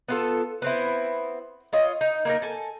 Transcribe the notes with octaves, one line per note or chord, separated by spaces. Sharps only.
B3 F4 A4
B3 C4 E4
F4 C#5 D#5
D#4
A#3 D#4 A#4
A4 G#5